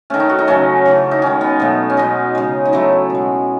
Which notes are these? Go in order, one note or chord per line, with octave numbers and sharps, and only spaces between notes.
D#3 A3 C#4
D#4
F#4
D#4
C#3 F#3 A3 C#4
C#3 E3 A3
D#4
D#3 G#3 C#4
B3
B2 F#3 A3
C#4
B2 G#3 D#4
C#3 G#3
D#4
C#3 F#3 A3 E4
B2 G#3